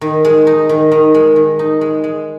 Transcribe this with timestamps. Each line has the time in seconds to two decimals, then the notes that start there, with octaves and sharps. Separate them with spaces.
0.01 D#3
0.25 G#3
0.47 D#4
0.69 D#3
0.92 D#3
1.14 G#3
1.36 D#3
1.59 D#4
1.81 G#3
2.04 G#3